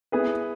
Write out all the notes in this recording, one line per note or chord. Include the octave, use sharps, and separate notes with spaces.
B3 E4 G#4 B4